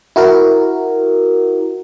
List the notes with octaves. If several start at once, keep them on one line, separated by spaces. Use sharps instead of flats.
E4 F#4 A#4